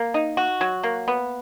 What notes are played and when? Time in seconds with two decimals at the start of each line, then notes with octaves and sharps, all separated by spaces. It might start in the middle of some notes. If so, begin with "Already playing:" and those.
Already playing: A#3
0.14 D#4
0.37 F#4
0.61 F#3
0.83 A#3
1.08 B3